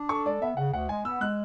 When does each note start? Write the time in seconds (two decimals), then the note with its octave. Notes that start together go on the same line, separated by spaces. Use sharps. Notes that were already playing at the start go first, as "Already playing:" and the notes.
Already playing: D4
0.09 A4 C#6
0.26 G#3 D5
0.41 B3 E5
0.57 C#3 F#5
0.73 D2 F#5
0.89 G#3 G#5
1.05 B3 E6
1.21 G#3 F#6